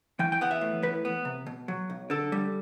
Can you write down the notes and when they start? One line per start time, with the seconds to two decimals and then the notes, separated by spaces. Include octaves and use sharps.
0.19 E3 G5
0.32 G5
0.41 B3 F#5
0.51 E5
0.61 A2
0.83 E3 B4
1.05 B3
1.25 C3
1.47 B2
1.68 F#3
1.90 B1
2.10 D3 A4
2.32 G3